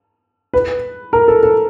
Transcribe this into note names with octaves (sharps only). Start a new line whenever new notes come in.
B4
A#4
A4
A4